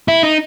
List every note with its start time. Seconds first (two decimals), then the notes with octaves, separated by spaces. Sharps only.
0.08 E4
0.23 D#4